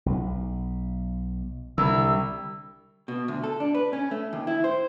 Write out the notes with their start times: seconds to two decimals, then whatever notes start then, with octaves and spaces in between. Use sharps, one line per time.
0.06 B1
1.78 C2 D3 E6
3.08 B2
3.28 D2
3.43 A4
3.60 D4
3.75 B4
3.93 C#4
4.11 A3
4.33 D#2
4.47 E4
4.64 C5